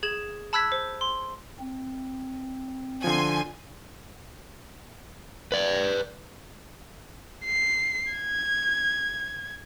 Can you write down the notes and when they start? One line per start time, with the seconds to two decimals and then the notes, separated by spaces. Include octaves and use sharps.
0.03 G#4 G#6 E7 F#7
0.53 A5 B5 E6 F#6 G#6 B6
0.72 C5
1.01 C6
1.60 C4
3.04 D3 F3 G#5 C6
5.52 B4 D5
7.45 C7
8.12 G#6